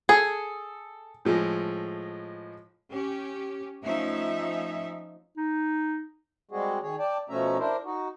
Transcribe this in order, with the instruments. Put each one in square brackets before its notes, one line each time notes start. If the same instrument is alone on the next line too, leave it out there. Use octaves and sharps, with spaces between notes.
[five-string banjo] G#4 [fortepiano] A4
[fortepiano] A2 F3 G#3
[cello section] C#4 G4
F3 A3 C#4 D#4 E5
[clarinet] D#4
[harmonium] G3 G#3 C4 F#4 G#4
D#3 G#4 C#5
D5 G5 A5
B2 F3 A3 C#4 E5 A#5
D4 E4 A#4 C5
D#4 F#4